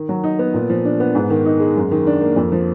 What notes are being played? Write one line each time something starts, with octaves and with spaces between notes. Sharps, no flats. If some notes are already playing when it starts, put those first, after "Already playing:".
Already playing: D#3
F#3
D#4
B3
A#2
F3
D4
B3
G#2
D#3
D#4
G#3
F#2
D#3
D4
A#3
F2
F3